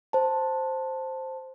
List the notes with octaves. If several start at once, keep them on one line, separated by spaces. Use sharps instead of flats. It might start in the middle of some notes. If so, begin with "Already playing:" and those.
C5 A5